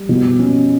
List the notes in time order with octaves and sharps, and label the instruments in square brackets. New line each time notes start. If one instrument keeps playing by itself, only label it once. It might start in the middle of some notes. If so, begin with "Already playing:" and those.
Already playing: [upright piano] G3
B2
C#4